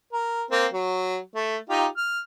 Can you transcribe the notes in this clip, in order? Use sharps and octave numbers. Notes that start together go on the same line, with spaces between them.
A#4
A#3 C4
F#3
A3
D#4 F4 G4
F6